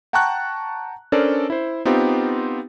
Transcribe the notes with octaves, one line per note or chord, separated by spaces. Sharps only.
F#5 G5 A5 A#5 C#6 F#6
C#4 D4 A4 A#4 C5 D5
E4 C5
B3 C4 D#4 F4 G4